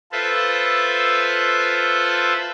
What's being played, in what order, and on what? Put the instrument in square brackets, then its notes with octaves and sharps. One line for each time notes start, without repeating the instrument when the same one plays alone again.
[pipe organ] F4 A4 B4 C5 E5